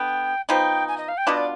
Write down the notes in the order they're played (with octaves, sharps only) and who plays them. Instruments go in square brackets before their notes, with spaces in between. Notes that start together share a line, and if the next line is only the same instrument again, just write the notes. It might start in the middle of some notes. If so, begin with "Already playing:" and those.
Already playing: [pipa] D3 B3 [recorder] G5
[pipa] F3 B3 D#4 [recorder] G5
[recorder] G#5
D#5
F5
G5
[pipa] B2 B3 D4 F4 [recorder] D#5
[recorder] D5